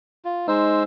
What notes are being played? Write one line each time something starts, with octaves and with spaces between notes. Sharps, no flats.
F4
G#3 D#4 C5 E6